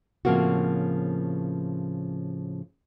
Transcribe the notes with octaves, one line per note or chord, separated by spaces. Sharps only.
A2 C#3 F3 A#3 C4 F#4